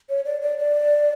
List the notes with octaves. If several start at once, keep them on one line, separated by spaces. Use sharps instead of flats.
C#5
D5
D5
D5